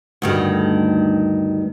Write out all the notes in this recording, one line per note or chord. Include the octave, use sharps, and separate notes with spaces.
D2 G2 D#3